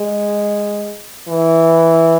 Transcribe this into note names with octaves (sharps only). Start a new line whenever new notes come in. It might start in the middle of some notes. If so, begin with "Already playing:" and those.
Already playing: G#3
E3